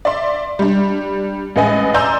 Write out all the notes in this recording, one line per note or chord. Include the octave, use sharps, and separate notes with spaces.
D5 E5 C6
G3 D4
A1 G#3 B4 D#5 G#5
D5 G#5 A#5 C6 E6 G6